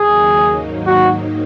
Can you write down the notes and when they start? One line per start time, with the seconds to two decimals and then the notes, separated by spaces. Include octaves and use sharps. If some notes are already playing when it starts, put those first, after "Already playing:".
Already playing: D#2 C#3 F#3 A#3 D#4 G#4
0.55 G#2 D#3 F#3 A#3 D#4
0.87 F#4